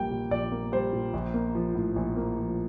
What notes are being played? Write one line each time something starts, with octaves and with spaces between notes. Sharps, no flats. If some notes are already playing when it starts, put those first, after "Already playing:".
Already playing: A#1 G3 A#3 G5
A#2
A#1 D5
A#3
G3 C5
A#2
A#1
A#3
F3
A2
A#1
A#3
F3